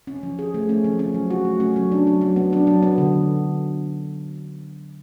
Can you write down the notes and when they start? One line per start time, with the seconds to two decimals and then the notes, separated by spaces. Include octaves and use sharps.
0.07 C#4
0.23 F3
0.39 G#4
0.54 A3
0.69 C#4
0.84 F3
0.99 C#4
1.14 F#3
1.30 F#4
1.45 A3
1.60 C#4
1.76 F#3
1.92 D4
2.07 F#3
2.21 F#3
2.36 B3
2.53 D4
2.67 F#3
2.83 B3
2.98 D3